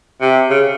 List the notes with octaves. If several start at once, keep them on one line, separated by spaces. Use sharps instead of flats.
C3
C#3